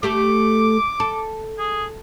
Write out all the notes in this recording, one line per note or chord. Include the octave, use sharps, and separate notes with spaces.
A3 G4 A4 D6
A4
G#4